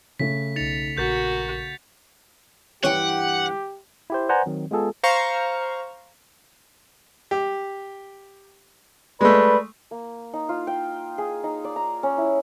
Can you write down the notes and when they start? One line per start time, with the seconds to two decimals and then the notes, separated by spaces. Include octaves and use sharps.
0.19 C#3 A3 B6
0.56 B1 D#4 A6 C#7 F7
0.98 A#1 F#4 A#4 A#5 G6 A6 B6
2.83 G2 E3 C#4 G4 F#5 G5
4.10 E4 G4 C5
4.29 B4 C5 D5 F#5 G#5 A#5
4.46 D#3 F#3 C4
4.71 G#3 B3 F4 G#4 A4
5.03 C5 F5 A#5 C#6
7.31 G4
9.21 G#3 A3 B4 D5 B5
9.91 A#3
10.33 D#4
10.49 F4
10.67 G5
11.18 G#4
11.43 D#4
11.64 D5
11.76 A#5
12.03 C#4
12.18 E4